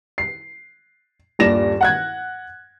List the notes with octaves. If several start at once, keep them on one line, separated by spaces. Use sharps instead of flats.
C7
D#1 G2 A#2 D5 A#6 E7
F#5 F#6 G#6